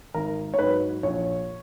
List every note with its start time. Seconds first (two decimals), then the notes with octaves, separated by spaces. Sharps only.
0.14 G#1 A#4
0.54 C#5
0.58 G#2 F#3 B4
1.03 A#1 C#5